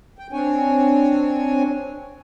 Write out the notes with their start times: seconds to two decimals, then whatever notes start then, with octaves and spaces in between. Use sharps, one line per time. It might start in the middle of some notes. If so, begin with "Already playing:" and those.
0.19 G5
0.33 C4 D4 C#5 G#5